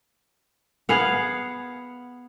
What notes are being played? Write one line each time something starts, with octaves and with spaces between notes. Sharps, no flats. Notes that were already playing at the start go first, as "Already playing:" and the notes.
B3 G#4 F5 F#5